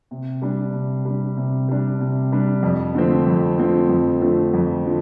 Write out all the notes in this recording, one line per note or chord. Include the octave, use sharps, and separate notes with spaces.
C3
G3 D4
C3
G3 D4
C3
G3 D4
C3
G3 D4
F2
D3 F3 A3 C4
F2
D3 F3 A3 C4
F2
D3 F3 A3 C4
F2
D3 F3